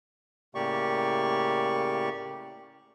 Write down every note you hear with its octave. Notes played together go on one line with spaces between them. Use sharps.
A2 C#3 A#3 G4 D5 C#6